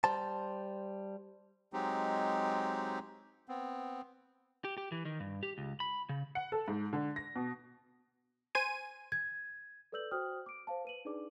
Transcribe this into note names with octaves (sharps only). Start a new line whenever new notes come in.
G3 C5 A5
F#3 G#3 C4 D#4 G4
B3 C4
G4
G4
E3
D#3
G2
G4
C#2
B5
C#3
F#5
A4
G#2
D3
A#6
B2
C5 G#5 D#7
G#6
A4 B4 D5 E6 G6 F#7
F#4 C5 G5 D#6 F6
D6 D7
C5 F5 A5
B4 D#7 F#7
D4 D#4 G#4 B4 D5 D6